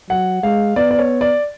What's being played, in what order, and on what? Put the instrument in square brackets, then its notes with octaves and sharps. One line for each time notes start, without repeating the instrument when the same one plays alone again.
[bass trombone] F#3 [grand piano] F#5
[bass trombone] G#3 [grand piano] F5
[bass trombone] B3 [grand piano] D5
[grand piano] D5
C#5
D5